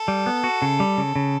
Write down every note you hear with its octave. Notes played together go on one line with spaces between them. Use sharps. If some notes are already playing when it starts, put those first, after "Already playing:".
Already playing: A4
G3
B3
F#4
C#3
G3
C#3
C#3